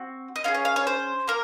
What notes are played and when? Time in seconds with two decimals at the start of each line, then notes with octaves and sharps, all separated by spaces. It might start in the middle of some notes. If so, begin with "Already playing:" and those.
Already playing: C4 F#4
0.36 D#5
0.44 C#4 F4 G#4 F5
0.54 C#5
0.65 F5
0.76 C#5
0.87 C5
1.28 A#3 A#4